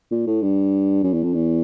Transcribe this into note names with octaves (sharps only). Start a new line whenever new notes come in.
A#2
A2
G2
F#2
E2
F2
E2